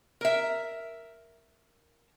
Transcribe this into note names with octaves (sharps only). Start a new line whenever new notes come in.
A#4 E5